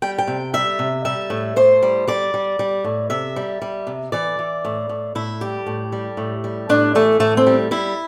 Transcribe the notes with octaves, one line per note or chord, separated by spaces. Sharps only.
G3 G5
G5
C3
G3 E5
C3
G3 E5
A2
A2 C5
G3
G3 D5
G3
G3
A2
C3 E5
G3
G3
C3
E3 D5
E3
A2
A2
A2 E4
G3 G4
A2
G3
A2
G3
A2 D4
E3 A3
A2 A3
C4
G3
G3 E4